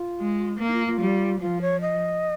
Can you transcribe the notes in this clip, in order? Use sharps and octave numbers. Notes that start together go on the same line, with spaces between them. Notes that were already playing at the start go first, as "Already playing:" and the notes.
Already playing: F4
G#3
A#3
D#4
F4
F4
G3
F3 F4
C#5
D#5